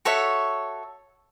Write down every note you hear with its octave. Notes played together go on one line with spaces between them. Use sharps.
F#4 A4 C#5 E5